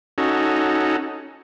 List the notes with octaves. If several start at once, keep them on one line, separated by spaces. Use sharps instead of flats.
C#4 D#4 F#4 A4